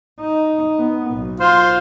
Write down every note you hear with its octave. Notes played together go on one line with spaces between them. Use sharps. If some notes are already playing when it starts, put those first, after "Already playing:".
D#4
B3
B1
F4 C5